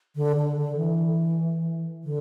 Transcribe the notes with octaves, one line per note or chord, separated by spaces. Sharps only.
D3
D3
D3
E3
D3